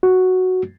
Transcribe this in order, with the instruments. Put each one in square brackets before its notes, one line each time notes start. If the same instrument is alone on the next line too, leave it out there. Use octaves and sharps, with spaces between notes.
[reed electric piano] F#4